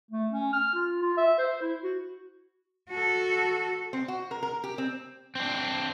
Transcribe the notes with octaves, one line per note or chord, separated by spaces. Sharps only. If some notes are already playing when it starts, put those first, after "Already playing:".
A3
C#4
F6
F4
F4
E5
C5
E4
F#4
F#4 A4
C4
F#4
A#4
A#4
G4
C4
C4 D4